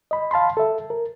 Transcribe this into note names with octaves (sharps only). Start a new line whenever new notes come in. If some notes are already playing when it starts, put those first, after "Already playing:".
D#5 B5
F5 A5 B5 C6
A4 E5
A#4